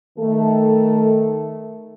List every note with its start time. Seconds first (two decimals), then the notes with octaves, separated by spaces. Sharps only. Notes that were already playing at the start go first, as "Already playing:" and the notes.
0.19 D#3 A3 A4